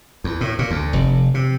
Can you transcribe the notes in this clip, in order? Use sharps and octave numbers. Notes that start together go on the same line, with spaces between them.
E2
A2
A#2
D2
F1
C3